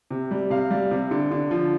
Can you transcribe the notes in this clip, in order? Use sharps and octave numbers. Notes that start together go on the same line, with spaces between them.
C3
G3
C3 F5
G3
C3
D3
D3
F3